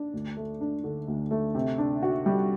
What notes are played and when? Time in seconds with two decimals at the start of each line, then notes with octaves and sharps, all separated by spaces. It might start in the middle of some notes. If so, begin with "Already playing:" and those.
Already playing: D4
0.13 D2
0.37 A3
0.61 D4
0.84 D3
1.08 D2
1.31 A3
1.55 C3
1.78 D4
2.02 F#4
2.26 G3